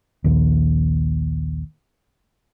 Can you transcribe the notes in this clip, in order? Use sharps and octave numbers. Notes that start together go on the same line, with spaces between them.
A#1 D#2